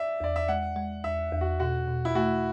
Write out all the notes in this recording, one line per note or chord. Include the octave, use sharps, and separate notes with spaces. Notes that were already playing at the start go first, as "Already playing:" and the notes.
Already playing: D5 E5
E2 D5
E5
G#3 F#5
G#3
E2 E5
E2
F#4
B2 F#4
B2
E4
A3 F#4